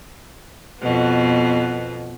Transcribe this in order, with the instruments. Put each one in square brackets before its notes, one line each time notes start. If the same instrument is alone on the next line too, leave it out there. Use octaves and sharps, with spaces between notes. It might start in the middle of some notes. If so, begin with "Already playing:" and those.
[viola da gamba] F2 B2 B3